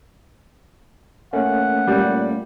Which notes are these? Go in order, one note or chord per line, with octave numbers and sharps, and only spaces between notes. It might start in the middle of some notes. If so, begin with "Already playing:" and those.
A3 A#3 C#4 F#5
A#2 G3